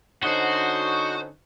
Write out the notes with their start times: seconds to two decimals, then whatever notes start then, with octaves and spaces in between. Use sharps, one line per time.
0.23 D3 C#4 D#4 F#4 C5 C6